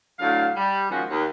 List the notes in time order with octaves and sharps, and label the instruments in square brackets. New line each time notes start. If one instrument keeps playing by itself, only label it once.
[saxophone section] A2 D3 F#3 F5
G3
D#3 F3 G#3 C#4 F4 F#4
D#2